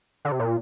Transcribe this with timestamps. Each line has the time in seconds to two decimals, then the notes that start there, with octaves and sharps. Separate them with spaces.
0.25 D3
0.32 C3
0.39 A#2